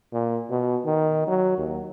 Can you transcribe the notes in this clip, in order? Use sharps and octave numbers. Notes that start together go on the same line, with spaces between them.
A#2
B2
D#3
F#3
D#2